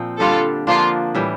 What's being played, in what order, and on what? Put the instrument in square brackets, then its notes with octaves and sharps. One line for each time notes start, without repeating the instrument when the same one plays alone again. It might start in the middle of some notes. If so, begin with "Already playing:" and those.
Already playing: [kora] A#2 F3 C4
[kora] D3 G3 D4 [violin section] F4 A4
[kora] D3 F3 A#3 D4 [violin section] F4
[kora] A2 E3 G3